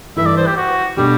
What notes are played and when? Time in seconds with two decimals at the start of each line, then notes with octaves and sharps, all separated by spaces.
0.17 G2 E3 A3 E4 E5
0.26 D5
0.37 C5
0.46 G4
0.57 F#4
0.97 B2 G3 A3 D4 G4